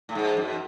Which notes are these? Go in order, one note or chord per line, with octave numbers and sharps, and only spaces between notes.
A2
G#2
F#2